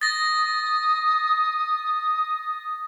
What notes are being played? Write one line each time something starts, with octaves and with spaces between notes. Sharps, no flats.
D#6 A6 A#6